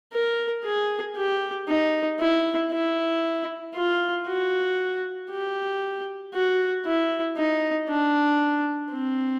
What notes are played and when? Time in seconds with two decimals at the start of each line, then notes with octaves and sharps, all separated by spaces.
0.13 A#4
0.64 G#4
1.16 G4
1.68 D#4
2.20 E4
2.72 E4
3.75 F4
4.27 F#4
5.31 G4
6.34 F#4
6.86 E4
7.37 D#4
7.89 D4
8.92 C4